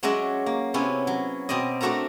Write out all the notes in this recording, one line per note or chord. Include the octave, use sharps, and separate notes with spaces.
F#3 G#3 C#4 F#4 D5 E5
A#3
C3 B3 C#4 E4
F#3
B2 C4 D5 D#5
A3 D4 F#4 A4 A#4 A#5